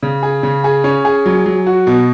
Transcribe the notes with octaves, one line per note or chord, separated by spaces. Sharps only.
C#3
G#4
C#3
G#4
C#4
G#4
F#3
F#3
F#4
B2